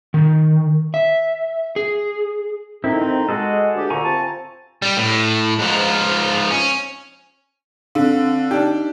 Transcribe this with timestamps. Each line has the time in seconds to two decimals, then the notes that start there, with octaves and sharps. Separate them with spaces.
0.14 D#3
0.94 E5
1.76 G#4
2.84 F2 D#3 C4 D#4 E4
3.02 C4
3.29 G#3 F#4 G#4 A4
3.75 D2 G4
3.90 D2 A#2 D3 G#5 A#5 C#6
4.03 C4 F4 A5
4.82 G3
4.97 A2
5.59 G#2 F3
6.51 C#4
7.95 D3 C4 F5
8.51 D4 D#4 G4